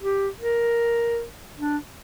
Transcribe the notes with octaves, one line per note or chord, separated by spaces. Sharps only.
G4
A#4
D4